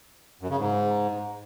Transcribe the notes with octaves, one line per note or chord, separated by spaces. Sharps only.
F#2
C#3
G#2